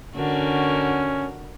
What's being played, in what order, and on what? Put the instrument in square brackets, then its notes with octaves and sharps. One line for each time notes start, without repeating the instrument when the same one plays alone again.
[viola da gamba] D3 F#4 A#4 [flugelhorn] C#4